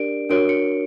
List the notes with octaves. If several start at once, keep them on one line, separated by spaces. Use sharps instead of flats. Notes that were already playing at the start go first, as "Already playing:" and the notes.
Already playing: D4 G4 A#4 D5 D7
D4 F#4 A#4 C#5 D7
C#7